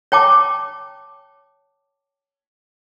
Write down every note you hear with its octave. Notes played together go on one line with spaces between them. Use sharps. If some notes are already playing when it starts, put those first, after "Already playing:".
C#5 G5 A5 D6